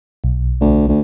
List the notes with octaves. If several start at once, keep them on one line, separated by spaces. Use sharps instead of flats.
B1
D2
D2